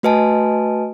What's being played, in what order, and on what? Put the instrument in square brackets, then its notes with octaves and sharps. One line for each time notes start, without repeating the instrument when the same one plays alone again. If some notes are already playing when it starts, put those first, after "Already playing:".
[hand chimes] A3 F#4 B4 D#5 G#5 A5